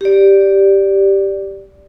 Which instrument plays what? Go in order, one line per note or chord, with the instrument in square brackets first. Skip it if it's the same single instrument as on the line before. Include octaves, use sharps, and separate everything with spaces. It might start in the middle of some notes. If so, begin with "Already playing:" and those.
[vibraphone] G4 D5